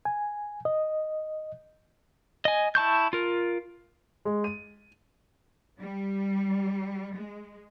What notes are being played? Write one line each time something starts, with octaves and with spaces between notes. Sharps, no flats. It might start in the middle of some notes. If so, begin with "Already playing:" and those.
G#5
D#5
D#5 G#5
E4 A5 C#6 G6
F4 A#4
G#3
D#7
G3
G#3